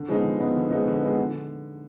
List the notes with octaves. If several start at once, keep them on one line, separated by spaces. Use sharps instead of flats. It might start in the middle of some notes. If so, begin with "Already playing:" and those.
Already playing: D3
F3 G#3 B3 D#4
D3
F3 G#3 B3 D#4
D3
F3 G#3 B3 D#4
D3
F3 G#3 B3 D#4
D3